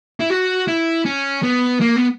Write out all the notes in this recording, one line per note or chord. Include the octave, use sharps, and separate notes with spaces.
E4
F#4
E4
C#4
B3
A#3
B3